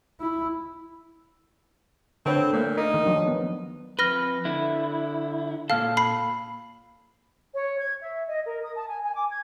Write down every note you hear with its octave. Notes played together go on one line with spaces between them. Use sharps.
E4
D3 C4 B4 C#5
A#2 A3 A#3
D#4 A#4
D#3
F3 F#3 D4
B3
F2 B4 F6 A#6 G7
D3 E4
A#2 A4 F5 F6
B5 C7
C#5
G#6
E5
D#5
A#4
D#6
A5
G#5
G#5
D6
G#6